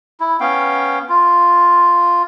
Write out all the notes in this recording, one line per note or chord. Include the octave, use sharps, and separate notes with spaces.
E4
B3 C#4 F5 G5
F4